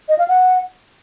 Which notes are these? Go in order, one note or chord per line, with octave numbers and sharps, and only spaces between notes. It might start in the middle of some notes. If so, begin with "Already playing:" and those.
D#5
F5
F#5